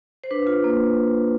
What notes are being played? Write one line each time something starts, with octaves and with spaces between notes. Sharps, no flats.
C5
D4 B4
F4
A#3